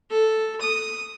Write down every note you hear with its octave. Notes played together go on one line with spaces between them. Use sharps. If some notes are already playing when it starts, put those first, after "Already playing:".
A4
D#6